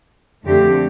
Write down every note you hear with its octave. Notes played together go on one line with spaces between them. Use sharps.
F2 D3 A3 C4 G4